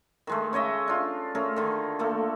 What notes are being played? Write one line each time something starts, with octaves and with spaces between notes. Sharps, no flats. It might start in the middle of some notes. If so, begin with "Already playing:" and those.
D#3 G#3 A3
C#3 C#5 D#5 E5
D4 F4
A3 C#4 G#4 A#4
D3 D#3
A3 A#3 A4